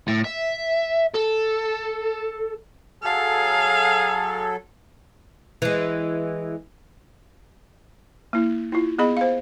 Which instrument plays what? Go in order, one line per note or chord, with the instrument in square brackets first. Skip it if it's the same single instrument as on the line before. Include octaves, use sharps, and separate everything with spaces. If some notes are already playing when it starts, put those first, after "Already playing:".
[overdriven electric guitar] A2
E5
A4
[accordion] F#3 A4 [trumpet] G#4 [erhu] F5
[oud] E3 G#3
[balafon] A#3 E4
E4 F4
B3 G#4 D#5 B5
C5 F5